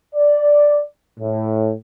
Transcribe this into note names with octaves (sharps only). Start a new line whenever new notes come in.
D5
A2